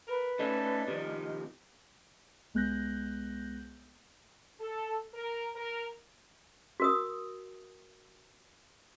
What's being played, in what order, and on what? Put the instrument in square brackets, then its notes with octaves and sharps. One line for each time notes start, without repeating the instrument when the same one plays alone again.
[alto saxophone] A#4 [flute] B4
[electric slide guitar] A3 C#4 A4 [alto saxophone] D#4 [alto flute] D5
[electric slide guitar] C3 D#3 F3
[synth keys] C2 G#3 B3 F#6 G6 A#6
[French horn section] A4
A#4
A#4
[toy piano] F#4 A#4 D#6